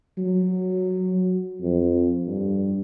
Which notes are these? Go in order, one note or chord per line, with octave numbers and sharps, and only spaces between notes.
F#3
F2
G2